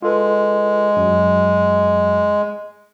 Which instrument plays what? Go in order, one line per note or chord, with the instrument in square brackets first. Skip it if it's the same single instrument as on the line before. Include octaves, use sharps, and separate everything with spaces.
[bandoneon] G#3 [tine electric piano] F4 A4 B4
[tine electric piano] F#2 F#3